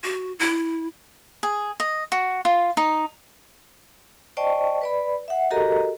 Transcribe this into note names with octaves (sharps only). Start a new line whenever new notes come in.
F#4
E4
G#4
D#5
F#4
F4
D#4
C5 D5 D#5 G5 A5 C#6
B4 D5 B5
E5 F#5
F#4 G4 A4 A#4 D#5 A#5